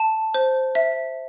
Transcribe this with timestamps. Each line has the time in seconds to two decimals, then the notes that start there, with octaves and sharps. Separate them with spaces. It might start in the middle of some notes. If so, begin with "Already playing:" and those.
Already playing: A5
0.34 C5
0.75 E5